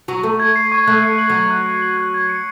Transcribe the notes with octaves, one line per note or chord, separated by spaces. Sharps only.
F#3 C#6
A3 C#6
G#6
C7
C#6
A3 F#6
C#7
F#7
F#3
F#6
F#6
C#7
F#7
F#6
G#6
C#7